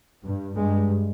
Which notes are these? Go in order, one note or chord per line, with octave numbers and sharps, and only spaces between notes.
G2
G2 G#3